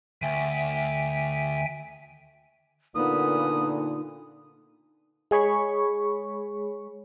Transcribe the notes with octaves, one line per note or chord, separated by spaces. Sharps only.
D2 E5 G5 G#5
A#2 D3 A#3 B3 D#4 D#6
G#3 G#4 C#5 B5 C#6